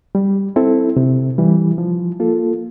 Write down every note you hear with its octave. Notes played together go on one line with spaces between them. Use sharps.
G3
C4 E4 A4
C3
E3 G3
F3
A#3 F4 A4